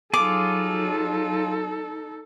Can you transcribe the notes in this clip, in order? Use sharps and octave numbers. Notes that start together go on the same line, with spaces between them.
F#3 D#4 F4 G#4 A4 D6